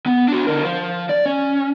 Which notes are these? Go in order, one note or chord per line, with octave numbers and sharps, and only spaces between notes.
B3
D4 F#4
D3 A#4
F3 F4
D5
C#4